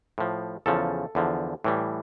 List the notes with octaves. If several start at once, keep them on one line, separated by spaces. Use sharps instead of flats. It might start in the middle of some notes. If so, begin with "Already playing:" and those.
A2 F3
E2 C#3 F3 A4
E2 D3 F3
A2 E3 G3